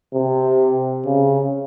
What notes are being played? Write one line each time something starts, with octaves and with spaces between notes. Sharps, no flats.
C3
C#3